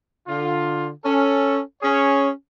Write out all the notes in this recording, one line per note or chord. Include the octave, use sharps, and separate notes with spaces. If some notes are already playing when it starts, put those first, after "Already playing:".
D3 F4
C#4 A4
C#4 G#4 C#5